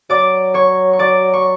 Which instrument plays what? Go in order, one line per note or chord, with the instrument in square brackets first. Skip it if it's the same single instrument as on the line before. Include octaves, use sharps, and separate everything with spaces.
[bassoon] F#3 [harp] D5 D6
[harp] C#5 C#6
C#6
D5 D6
C#6